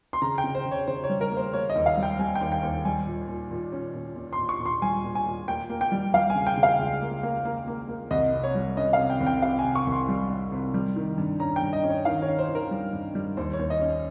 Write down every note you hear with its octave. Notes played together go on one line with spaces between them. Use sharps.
C6
C#3 A#5
G5
C#3
C5
C#3
C#5
C#3 C5
C#5
G3
A#4
A#3
C5
A#3 C#5
D#5
D#2
F5
G3
G5
G3 G#5
G5
D#2
G5
D#2
G3 G#5
A#2
A#2
A#2
C#4
A#2
A#2
C6
A#2
C#6
A#2
C6
G3 G#5
A#2
G#5
A#2
A#3 G5
A#3
G5
G3
G3 F5
G#5
C#3
G5
C#3
F5
C#2
A#3
A#3
A#3
A#3
A#3
C2 D#5
C3
C#5
G3
C#4 D#5
F5
C3
G5
C2
G5
C3 F5
G#5
C3
C#6
C2
C6
G3
G3
C3
G3
D#3
G2
C#4 A#5
G5
G2
D#5
C#4
C#5
D#3 F5
C#5
C#4
C5
D#3
A#4
G3
G2
G3
D#2 C5
C#5
D#2
D#5
C#4